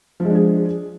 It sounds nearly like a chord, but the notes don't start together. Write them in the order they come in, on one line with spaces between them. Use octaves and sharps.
F3 G#3 D4 G#4